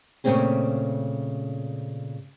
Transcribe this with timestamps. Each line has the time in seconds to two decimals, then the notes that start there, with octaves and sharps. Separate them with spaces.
0.24 A#2 C#3 A3 C4 C#4 G#4